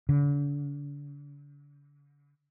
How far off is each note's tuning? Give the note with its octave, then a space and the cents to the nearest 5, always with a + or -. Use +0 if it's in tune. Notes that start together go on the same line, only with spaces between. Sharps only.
D3 -40